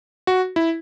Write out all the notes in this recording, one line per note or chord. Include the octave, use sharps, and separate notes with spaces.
F#4
E4